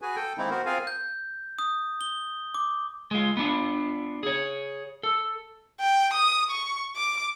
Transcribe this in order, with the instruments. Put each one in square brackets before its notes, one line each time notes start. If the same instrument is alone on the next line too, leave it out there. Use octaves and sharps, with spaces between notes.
[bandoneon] F#4 G#4 B4 G#5
A4 G5
D#3 G#3 A#3 C4 D#4 E4
B3 F#4 A#4 C5
C4 F4 G#4 A#4 F5 G#5
[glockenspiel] G6
D#6
G7
D6
[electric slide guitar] G#3 F4
B3 D4 F4
G#4 C#5
A4
[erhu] G5
D#6
C#6
D6